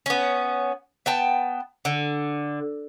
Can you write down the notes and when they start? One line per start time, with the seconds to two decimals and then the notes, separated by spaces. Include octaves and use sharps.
0.06 B3 C#4
1.06 B3 G5 A5
1.85 D3